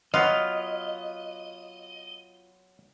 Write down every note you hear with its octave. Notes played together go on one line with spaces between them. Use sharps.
F#3 B3 F4 D#5 F5